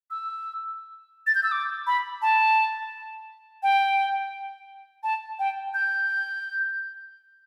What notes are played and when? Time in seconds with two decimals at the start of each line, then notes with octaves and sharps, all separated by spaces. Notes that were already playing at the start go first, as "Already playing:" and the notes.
0.10 E6
1.27 A6
1.35 G6
1.43 E6
1.52 D6
1.87 B5
2.22 A5
3.63 G5
5.03 A5
5.39 G5
5.74 G6